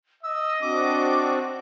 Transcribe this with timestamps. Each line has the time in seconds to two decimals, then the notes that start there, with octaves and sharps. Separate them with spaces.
0.23 D#5 E6
0.61 C4 D4 F#4 D6